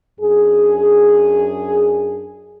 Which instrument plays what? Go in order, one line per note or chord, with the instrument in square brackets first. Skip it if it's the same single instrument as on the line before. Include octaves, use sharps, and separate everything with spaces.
[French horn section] F#2 D4 G#4